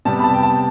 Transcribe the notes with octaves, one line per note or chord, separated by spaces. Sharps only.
C3 G3 B3 A5
B5
A5
G5
A5